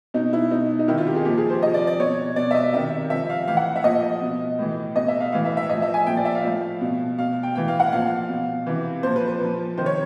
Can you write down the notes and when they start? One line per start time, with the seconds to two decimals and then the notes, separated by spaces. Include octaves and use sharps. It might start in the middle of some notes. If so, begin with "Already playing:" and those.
0.14 B2 D#4
0.33 E4
0.51 B2 D#4
0.79 D#4
0.88 C3 D#3 E4
0.98 F4
1.07 G4
1.16 G#4
1.25 A#2 F3 G4
1.38 G#4
1.50 C5
1.62 C3 F3 D#5
1.74 D5
1.87 D5
1.99 B2 C#5
2.36 B2 D5
2.51 E5
2.55 D#5
2.73 C3 D#3 E5
3.10 C3 F3 E5
3.30 F5
3.47 A2 E3 F5
3.57 F#5
3.76 E5
3.84 A#2 F3 D#5
4.22 B2
4.59 A2 E3
4.96 B2 D#5
5.08 E5
5.20 F5
5.32 A2 E3 F5
5.45 E5
5.57 E5
5.69 A2 F3 D#5
5.82 E5
5.94 G#5
6.07 A#2 F3 G5
6.17 D5
6.25 E5
6.35 F5
6.44 A2 F3
6.81 B2
7.18 B2 F5
7.43 G5
7.55 A2 E3 G5
7.68 F5
7.80 F#5
7.92 A#2 F3 F5
8.29 B2
8.66 C3 E3
9.03 A#2 F3 C5
9.16 B4
9.28 B4
9.41 A#2 F3
9.78 C3 D#3 C5
9.86 C#5